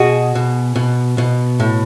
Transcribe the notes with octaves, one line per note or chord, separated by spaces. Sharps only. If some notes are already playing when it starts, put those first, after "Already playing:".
Already playing: B2 F#4 G#4
B2
B2
B2
A2